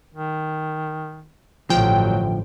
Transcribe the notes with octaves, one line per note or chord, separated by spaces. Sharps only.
D#3
A1 D2 G2 F3 F#3 G5